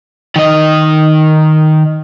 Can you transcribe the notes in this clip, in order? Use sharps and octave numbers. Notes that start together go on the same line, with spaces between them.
D#3 D#5